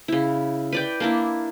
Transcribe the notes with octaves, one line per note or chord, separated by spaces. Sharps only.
C#3 E4
B4 D5 G5
A#3 D4 E4